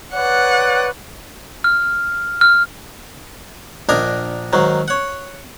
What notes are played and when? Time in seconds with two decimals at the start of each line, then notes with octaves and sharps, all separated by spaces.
0.14 B4 C#5 D5 F#5
1.64 F6
2.41 F6
3.89 A#1 D4 A#4 D#5 G#5 A#5
4.53 G#2 D#3 F#3
4.88 C#5 F#5